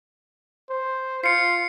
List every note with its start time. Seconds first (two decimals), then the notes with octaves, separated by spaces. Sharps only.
0.70 C5
1.24 F4 C7 C#7